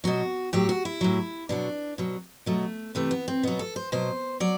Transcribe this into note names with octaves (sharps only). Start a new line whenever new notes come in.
B2 F#3 F#4
A2 F#3 G4
F#4
E4
A2 F#3
B2 F#3 D4
B2 F#3
B2 F#3 A3
C3 E3 A3
B3
C4
B2 F#3 B3
A4
C5
B2 F#3 C5
F#3 D5